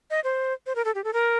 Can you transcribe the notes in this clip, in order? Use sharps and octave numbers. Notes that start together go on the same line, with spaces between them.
D#5
C5
C5
A#4
A4
G4
A4
A#4